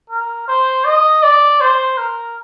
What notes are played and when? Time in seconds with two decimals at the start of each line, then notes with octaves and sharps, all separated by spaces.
0.10 A#4
0.48 C5
0.85 D#5
1.23 D5
1.61 C5
1.98 A#4